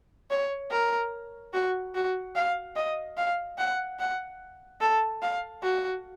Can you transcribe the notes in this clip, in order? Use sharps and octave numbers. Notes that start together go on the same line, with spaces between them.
C#5
A#4
F#4
F#4
F5
D#5
F5
F#5
F#5
A4
F5
F#4